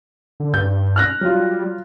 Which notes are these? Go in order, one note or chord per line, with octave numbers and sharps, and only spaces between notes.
D3
G2 G6
F6 F#6 A#6
F#3 G3 F4